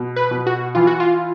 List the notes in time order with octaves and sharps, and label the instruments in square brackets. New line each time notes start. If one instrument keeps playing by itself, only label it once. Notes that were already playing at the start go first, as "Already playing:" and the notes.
Already playing: [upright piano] B2
[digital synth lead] B4
[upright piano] B2
[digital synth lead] F#4
[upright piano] E3 [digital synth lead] F4
[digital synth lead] F#4
F4